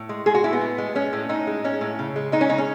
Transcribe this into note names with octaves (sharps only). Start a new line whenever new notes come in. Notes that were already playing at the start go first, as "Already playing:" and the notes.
Already playing: A2
G#3
G#3 G#4
F#4
A2 E4
B3
A2
G#3
G#3 C#4
A2
A2 D#4
G#3
G#3 C#4
A2
C#3
G#3
G#3 D#4
C#4
C#3 D#4
C#4